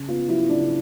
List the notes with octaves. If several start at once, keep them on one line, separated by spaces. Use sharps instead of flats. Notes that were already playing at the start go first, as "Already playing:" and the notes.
Already playing: C#3
B3 F4
F#3 E4
C#3 D4